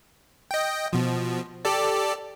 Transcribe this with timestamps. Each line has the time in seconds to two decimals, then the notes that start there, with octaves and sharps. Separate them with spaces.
0.51 D#5 G5
0.93 B2 F3
1.65 G4 A4 D5